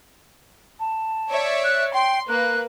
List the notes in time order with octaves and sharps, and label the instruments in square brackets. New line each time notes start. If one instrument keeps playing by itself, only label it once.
[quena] A5
[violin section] C#5 D5 E5
[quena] F#6
[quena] G5 [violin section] C6
[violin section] A#3 B4 [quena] F#6